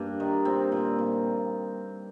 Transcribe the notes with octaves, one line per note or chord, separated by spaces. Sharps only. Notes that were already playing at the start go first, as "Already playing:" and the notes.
Already playing: G2 A#3 D4
D#3
A#2 C4
A#2
A#2